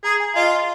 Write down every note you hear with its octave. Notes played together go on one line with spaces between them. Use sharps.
G#4 A#5
G#5
F4 D#5